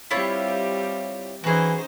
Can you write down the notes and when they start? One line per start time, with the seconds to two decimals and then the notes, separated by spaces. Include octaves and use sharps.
0.11 G3 C4 E4 F4 G4 C#5
1.44 E3 C#4 D#4 F#4 G#4 C5